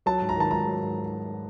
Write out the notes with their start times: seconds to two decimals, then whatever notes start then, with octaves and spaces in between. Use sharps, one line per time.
0.06 F#3 A5
0.22 G#2
0.29 A#5
0.37 D#3 A5
0.51 G#2 A#5
0.67 F#3
0.82 G#2